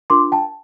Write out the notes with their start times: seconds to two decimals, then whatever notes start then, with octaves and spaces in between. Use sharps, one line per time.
0.10 D4 F4 A#4 C6 D6
0.32 G5 A5